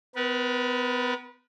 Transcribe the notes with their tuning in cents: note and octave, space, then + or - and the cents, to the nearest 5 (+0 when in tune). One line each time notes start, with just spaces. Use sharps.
B3 +35 B4 -35